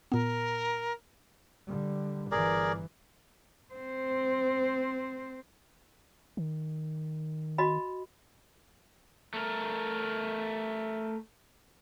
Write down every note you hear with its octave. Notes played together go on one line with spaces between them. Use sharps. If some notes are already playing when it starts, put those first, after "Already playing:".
A#2 B3 A#4
D3 G3
G1 E3 G#4 A#4 D5
C4 C5
D#3
F#4 D#5 B5
A3 A#4